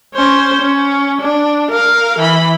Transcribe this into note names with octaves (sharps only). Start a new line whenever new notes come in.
C#4 C5
C#4
D4
A#4 F5
E3 B5